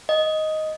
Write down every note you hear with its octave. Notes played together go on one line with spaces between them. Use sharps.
D#5